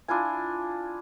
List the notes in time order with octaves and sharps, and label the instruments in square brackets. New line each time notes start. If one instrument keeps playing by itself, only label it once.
[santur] D4 E4 F4 G#5